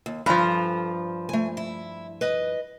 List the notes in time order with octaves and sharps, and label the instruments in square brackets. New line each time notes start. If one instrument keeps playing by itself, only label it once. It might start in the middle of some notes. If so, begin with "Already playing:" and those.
[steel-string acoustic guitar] D#2
[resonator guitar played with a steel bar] G2 F3 [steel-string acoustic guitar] A4 G#5 A#5
[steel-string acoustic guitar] A3 G#5
E4
B4 D#5